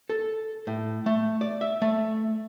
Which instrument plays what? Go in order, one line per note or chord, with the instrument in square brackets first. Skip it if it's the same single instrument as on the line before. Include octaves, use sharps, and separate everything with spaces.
[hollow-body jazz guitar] A4
A2
A3
D5
E5
A3